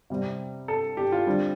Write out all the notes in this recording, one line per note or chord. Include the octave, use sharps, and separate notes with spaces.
C3 G3 C4
A4
G4
F4
D3 G3 C4